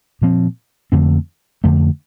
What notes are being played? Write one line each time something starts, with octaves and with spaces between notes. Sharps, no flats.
A#2 F3 C4
F2 D3 A3 C4
F2 D3 A3